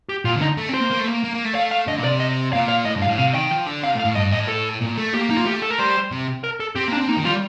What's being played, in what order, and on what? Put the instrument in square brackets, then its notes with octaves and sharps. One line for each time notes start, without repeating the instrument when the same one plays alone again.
[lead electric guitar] G4
[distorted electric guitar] A#2 [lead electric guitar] F4
[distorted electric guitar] D3
[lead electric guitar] D#4
[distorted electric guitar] A3
[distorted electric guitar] C4 [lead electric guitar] C5
[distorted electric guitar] A#3
A#3
A3
A#3
A#3
A#3
A3
[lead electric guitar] F5
F5
[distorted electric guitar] D3 [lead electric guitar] D#5
[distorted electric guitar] A#2
[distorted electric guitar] C3 [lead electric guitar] D5
[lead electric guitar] D#5
[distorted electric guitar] A#2 [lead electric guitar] F5
[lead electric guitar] F5
[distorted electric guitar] A2 [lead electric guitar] D#5
[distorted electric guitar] G2
[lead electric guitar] F5
[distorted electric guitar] A2
[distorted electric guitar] C3 [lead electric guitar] F5
[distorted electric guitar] D#3 [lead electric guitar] G5
[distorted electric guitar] F3
D3
[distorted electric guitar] C3 [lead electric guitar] F5
[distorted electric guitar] A2
[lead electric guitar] F5
[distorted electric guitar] A2
[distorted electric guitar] G2 [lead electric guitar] D#5
[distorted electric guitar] A2 [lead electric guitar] D#5
[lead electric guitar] A4
[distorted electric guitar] A#2
A3
[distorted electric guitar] A#3 [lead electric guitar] G4
[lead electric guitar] D#4
F4
[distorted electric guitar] A3 [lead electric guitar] G4
[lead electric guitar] A4
A#4
[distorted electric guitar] G3 [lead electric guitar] C5
[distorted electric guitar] C3
[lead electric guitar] A#4
A4
[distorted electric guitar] C4 [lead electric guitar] G4
[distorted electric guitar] A#3
[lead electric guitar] D4
[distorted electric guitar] C4
[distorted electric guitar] A#3 [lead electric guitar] D#4
[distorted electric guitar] D#3
[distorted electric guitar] G3 [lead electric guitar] F4